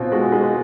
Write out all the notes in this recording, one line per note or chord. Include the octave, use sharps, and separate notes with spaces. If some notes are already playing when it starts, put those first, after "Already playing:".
Already playing: B2 C4 F4
G#3 F#4
G#3